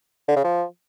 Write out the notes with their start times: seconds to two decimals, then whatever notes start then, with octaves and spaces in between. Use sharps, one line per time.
0.29 D3
0.36 C#3
0.44 F3